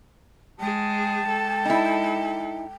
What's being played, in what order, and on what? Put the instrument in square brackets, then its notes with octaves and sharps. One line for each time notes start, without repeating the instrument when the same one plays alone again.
[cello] G#3 G#4 [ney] G5 [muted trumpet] A5
[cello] G#3 A4
[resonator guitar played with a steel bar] D#4 E4